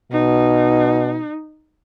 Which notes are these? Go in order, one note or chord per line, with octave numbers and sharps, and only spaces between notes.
B2 D#4